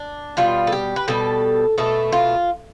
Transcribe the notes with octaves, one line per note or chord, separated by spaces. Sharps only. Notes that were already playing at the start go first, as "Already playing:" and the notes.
Already playing: D4
B2 G3 F4
A4
G4
B4
B2 G3 A4
B2 A3 A4
F4